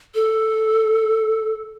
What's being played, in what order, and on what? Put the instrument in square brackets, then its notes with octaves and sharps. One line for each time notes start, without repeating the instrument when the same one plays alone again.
[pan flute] A4